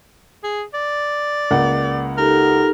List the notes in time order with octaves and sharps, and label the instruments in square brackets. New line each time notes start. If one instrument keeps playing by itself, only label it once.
[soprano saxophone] G#4
D5
[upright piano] C#2 A#3 F#5
[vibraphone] D#4 G4 A4 [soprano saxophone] A#4